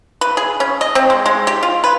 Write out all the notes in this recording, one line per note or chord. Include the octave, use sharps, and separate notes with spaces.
B4
G#4
C#4
D#5
C4
G#3
G#3
G4
F4
B4